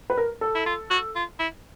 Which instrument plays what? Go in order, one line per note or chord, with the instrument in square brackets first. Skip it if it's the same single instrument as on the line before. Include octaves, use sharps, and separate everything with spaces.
[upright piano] B4
A#4
A4
[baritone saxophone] E4
F4
F#4
F4
E4